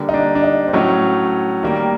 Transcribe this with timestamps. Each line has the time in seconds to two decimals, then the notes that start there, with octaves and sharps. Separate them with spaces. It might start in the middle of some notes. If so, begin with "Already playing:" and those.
Already playing: D3 G3 A#3
0.09 D#4
0.14 D4
0.35 D4
0.44 D#4
0.67 C4
0.73 A2 F#3 A3 C#4
1.63 D#3 G3 A#3